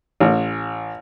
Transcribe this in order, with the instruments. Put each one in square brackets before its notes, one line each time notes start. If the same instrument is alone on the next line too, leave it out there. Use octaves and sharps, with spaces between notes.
[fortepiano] A1